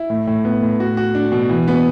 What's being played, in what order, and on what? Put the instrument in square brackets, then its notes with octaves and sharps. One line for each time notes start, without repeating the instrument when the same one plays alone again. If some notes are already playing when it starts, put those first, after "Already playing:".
Already playing: [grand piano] E4
A2
A2
B3
A2
F#4
F#4
D4
B2
E3
B3